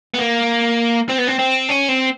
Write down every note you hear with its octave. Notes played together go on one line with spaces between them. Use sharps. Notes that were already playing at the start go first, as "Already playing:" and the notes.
B3
A#3
C4
B3
C4
C4
C#4
C4